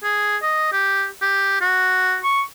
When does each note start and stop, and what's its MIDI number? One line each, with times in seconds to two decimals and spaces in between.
0.03 0.37 68
0.43 0.69 75
0.72 1.07 67
1.22 1.57 67
1.61 2.17 66
2.24 2.43 85